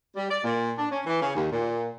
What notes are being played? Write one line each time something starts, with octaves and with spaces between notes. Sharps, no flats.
G3
D5
A#2
D4
C#4
E3
C#3
D#2
A#2